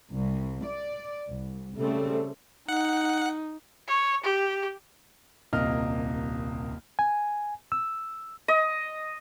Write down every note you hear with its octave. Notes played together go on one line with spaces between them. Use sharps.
C2
D5
C2
C#3 G3 A3 C4
D#4 F#5
C#5
G4
D#1 C2 A#3 D#5 F6
G#5
E6
D#5